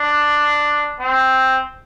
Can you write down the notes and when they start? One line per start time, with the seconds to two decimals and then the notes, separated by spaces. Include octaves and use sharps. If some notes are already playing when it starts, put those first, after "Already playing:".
Already playing: D4
1.00 C4